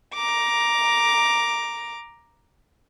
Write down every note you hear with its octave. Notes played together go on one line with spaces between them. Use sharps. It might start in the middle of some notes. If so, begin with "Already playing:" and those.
A#5 D6